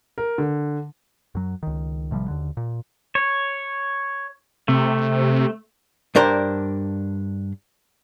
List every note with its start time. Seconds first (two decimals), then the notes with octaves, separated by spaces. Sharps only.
0.18 A#4
0.38 D3
1.35 F#2 F#3
1.63 C#2 D#3
2.11 A1 C3 F3 G3
2.28 D#2 D3
2.57 A#2
3.15 C#5
4.68 C3 A3
6.15 G2 D4 A#4 C5